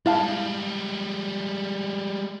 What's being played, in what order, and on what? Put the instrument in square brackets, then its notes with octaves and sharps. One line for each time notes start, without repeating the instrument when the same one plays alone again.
[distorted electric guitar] G3 G#3 [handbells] E4 F5 A5